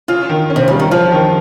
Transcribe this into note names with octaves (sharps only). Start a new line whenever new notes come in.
C#3 F4
D#3
C#4
C3
C#3 G3
D#3
F3 F4
D#3